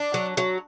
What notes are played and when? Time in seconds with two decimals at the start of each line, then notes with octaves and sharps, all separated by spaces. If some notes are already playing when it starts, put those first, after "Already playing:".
Already playing: D4
0.14 F#3
0.37 F#3